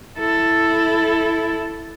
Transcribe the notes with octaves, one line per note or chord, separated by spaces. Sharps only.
E4 A4